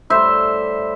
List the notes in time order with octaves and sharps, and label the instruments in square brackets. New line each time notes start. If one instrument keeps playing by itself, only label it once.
[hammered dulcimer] A2 G3 C5 E5